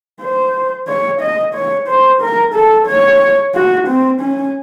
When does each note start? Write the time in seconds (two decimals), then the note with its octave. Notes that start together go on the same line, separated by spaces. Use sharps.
0.21 C5
0.88 C#5
1.21 D#5
1.54 C#5
1.88 C5
2.21 A#4
2.54 A4
2.87 C#5
3.54 F#4
3.87 C4
4.21 C#4